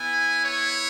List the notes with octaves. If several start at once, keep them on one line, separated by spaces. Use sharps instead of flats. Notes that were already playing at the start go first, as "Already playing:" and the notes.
Already playing: B3 E4 G#5
C#5